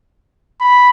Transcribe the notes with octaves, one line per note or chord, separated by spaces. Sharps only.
B5